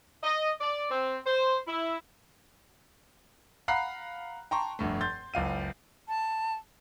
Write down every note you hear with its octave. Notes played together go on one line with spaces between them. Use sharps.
D#5
D5
C4
C5
E4
F5 F#5 A#5 B5 F#6 C7
G5 A5 A#5 C6 C#6
F1 G2 A3
C6 G6 A6
F#1 C#2 F5 D#7
A5